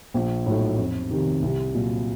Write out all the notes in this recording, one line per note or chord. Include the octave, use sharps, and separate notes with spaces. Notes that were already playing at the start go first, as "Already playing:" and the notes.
A#1
A2 F#3 A3 D#4
F2
C3 D#3
C2
A#2 F#3